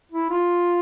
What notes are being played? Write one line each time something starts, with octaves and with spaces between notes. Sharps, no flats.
E4
F4